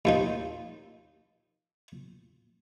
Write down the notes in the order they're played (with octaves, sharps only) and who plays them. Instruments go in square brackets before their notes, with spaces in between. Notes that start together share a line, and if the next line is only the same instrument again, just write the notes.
[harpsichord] D#2 F3 D#4